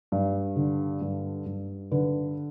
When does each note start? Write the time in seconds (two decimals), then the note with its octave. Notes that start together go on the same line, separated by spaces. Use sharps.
0.12 G2
0.56 D3
1.01 G2
1.46 G2
1.91 D3 B4